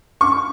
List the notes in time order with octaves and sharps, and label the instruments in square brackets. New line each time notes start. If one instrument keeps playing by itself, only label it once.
[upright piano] C#6